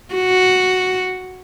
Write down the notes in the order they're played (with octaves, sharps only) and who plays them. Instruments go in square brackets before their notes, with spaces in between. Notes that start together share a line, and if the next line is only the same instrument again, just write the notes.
[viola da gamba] F#4